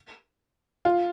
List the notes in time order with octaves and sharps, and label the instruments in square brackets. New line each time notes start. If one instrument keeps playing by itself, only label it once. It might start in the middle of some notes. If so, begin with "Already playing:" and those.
[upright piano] F4